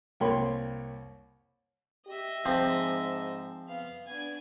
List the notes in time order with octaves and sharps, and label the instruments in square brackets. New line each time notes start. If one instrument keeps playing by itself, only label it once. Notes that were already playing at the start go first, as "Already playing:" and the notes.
[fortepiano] C2 A#3 C#5 G5 B5 C6
[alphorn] G4 [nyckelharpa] D#5 E5
[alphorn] G#2 [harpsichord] F3 C4
[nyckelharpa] B3 F5
[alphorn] B3 [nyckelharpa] D4 G#5